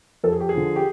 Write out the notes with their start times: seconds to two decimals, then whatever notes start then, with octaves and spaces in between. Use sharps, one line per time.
0.24 F2 A4
0.32 G#4
0.40 G4
0.49 G#4
0.54 D3 F3
0.76 G4